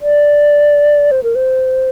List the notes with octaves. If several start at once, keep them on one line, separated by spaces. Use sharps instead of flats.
D5
C5
A#4
C5